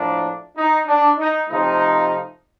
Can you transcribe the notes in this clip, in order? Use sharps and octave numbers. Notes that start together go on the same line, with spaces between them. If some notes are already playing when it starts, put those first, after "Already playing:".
Already playing: A2 F3 A#3 D4
D#4
D4
D#4
C3 F3 A3 D#4